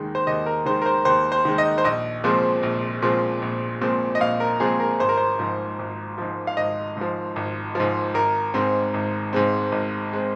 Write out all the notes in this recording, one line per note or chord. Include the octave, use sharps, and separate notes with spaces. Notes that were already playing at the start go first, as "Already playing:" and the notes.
Already playing: D#2 D#3 G#3
C5
D#2 D#5
A#4
D#3 G#3 C5
A#4
C5
D#2 C5
C5
D#3 G#3
D#5
C5
A#1 D#5
A#2 F3 G#3 C4
A#1
A#2 F3 G#3 C4
A#1
A#2 F3 G#3 C4
D#5
A#1 F5
A#4
A#2 F3 G#3 C4 G#4
A#4
G#1 C5
A#4
C5
G#2 F3
G#1
G#2 F3
F5
G#1 D#5
G#2 F3
G#1
G#2 F3
G#1 A#4
G#2 G#3 C4
G#1
G#2 G#3 C4
G#1
G#3 C4